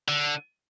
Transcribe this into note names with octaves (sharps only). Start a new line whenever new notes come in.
D3